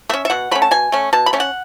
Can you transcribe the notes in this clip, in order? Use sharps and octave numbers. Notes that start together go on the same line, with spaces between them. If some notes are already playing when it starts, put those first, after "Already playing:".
A3 C#4 E5
E5
B2 F#5
A3 C#4 B5
A5
B2 G#5
A3 C#4
B2 A5
B5
A3 C#4
F#5